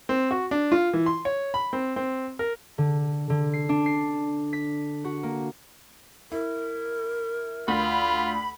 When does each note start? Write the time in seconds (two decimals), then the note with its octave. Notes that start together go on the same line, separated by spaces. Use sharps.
0.09 C4
0.31 F#4
0.51 D4
0.72 F4
0.93 E3
1.06 C6
1.25 C#5
1.54 B5
1.73 C4
1.96 C4
2.39 A#4
2.78 D3
3.30 D3
3.53 C7
3.69 D4
3.86 C7
4.53 B6
5.04 F#4
5.23 A#3
6.32 E4 A#4
7.68 D2 F4 B5